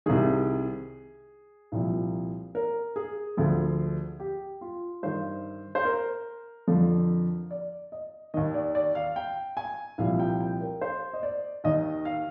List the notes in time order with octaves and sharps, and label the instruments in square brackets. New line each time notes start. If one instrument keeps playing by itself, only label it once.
[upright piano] C2 C3 D#3 G#4
C2 A#2 F3
A#4
G#4
D2 D3 F3
G4
F4
G2 D#3 C5
C5
A#4
F2 D3 F3
D5
D#5
D#2 D#3 D#5
D5
D5
F5
G5
G#5
C2 A#2 F3 F5
G5
G5
A#4
C5
D#5
D5
D#2 D#3 D#5
F5